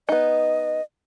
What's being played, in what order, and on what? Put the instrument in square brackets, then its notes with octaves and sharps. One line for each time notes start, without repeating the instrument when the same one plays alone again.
[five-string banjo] B3 D#4 [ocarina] D#5